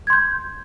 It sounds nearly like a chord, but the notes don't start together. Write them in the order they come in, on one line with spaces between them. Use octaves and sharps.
G#6 C6 G6